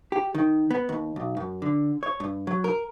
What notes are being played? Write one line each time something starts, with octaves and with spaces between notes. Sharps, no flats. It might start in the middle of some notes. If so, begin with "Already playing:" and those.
G4
D#3
B3
D#2
B1
F#2
D3
C#5
G2
F#3
A#4